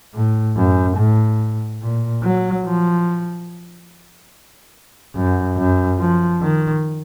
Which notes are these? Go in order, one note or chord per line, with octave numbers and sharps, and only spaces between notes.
A2
F#2
A2
A#2
F#3
F3
F#2
F#2
F3
D#3